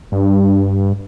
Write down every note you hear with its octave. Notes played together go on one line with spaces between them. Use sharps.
G2